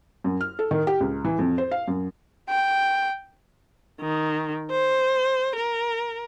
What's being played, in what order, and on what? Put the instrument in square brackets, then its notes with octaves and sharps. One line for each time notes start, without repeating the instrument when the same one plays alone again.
[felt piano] F#2
F6
A4
D#3
G4
C#2
E3
F2
C5
F5
F#2
[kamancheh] G5
[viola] D#3
C5
A#4